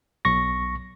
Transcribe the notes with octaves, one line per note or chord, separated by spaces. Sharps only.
B1 C#6 A#6